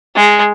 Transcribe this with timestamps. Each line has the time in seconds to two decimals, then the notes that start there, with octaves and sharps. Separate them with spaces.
0.16 G#3